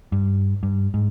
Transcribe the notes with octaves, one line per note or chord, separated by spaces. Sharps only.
G2
G2
G#2